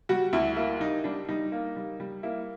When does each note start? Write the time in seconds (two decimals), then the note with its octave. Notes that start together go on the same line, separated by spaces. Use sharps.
0.09 G3 F#4
0.33 D2 E4
0.56 A#3 E4
0.80 G3 D#4
1.04 G3 D4
1.29 G3 D#4
1.52 A#3
1.76 G3
2.00 G3
2.23 A#3 E4